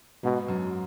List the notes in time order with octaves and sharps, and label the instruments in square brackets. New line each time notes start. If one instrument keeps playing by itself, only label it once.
[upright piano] G#2 [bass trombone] B2
[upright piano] F#2